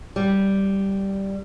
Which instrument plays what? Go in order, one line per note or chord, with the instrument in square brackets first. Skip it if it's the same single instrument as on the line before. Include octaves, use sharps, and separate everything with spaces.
[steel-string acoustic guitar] G3